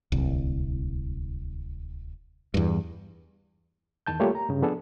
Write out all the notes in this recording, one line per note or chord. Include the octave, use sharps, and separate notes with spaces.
D1 C2
E2 G2
E2 D#3 A5 G6
G3 A3 A#3 F4 G4 C#5
A#5
G2 C#3
F3 B3 D4 G#4 A4